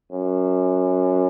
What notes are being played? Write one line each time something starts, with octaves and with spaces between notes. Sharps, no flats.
F#2